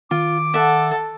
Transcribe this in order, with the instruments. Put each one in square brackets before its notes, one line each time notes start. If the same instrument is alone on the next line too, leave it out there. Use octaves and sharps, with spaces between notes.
[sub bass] D#3 [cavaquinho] F4 [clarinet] D6
[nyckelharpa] A4 [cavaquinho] E5 F#5